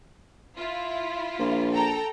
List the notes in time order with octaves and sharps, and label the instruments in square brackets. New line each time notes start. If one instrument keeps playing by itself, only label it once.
[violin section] E4 F4
[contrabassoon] A#1
[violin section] A4 G5 A#5